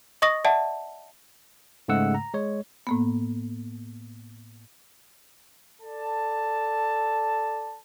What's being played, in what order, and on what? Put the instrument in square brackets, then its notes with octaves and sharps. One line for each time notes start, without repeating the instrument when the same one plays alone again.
[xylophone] D#5 C#6 D#6 A#6
D5 E5 F#5 A5
[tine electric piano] G#2 C#3 G#3 A3 F#5 E6
A#5
G#3 C#5
[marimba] A2 A#3 B3
[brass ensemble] A4 D5 A5